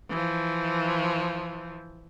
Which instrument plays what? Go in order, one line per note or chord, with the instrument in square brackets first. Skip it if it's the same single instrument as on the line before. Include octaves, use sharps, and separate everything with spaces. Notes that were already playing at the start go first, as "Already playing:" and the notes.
[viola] E3 F3